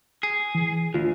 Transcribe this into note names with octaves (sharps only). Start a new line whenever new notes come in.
G#4
E3
D2 F4